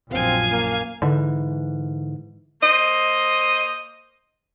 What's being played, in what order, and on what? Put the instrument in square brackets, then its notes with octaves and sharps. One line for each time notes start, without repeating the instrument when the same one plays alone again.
[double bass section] A#1 F#2 F3 [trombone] C4 [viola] F5 G#5
[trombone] A#3
[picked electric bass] G#2 E3 [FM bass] D3
[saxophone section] A#3 C5 D#5